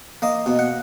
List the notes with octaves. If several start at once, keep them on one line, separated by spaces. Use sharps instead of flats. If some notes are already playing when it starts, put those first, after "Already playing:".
A#3 D#5
B2
F#5